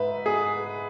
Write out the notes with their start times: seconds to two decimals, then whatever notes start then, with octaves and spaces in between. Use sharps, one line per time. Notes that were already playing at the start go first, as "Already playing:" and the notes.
Already playing: G#2 B4 E5
0.26 G#4